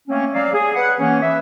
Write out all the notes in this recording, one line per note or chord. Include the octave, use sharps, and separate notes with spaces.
A3 A#3 C4 C#4
F#3 D5 F5
G#4
B4 F#5
E3 A#3 C#4
B4 E5